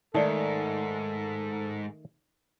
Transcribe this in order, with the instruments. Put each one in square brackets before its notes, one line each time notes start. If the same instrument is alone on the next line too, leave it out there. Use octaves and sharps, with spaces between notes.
[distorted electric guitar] G#2 [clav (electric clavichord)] D#3 A3 [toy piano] D#4 D5 [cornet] A4